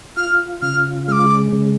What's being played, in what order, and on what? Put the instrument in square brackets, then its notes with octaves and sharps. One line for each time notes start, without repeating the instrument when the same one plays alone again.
[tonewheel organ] F4 [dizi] F6
[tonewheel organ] C#3 [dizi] F6
[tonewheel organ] G#3 [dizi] F6
[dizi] D6
[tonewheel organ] C#3